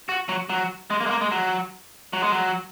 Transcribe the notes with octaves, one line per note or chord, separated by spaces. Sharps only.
F#4
F#3
F#3
G#3
A#3
G#3
A#3
G#3
F#3
F#3
G#3
F#3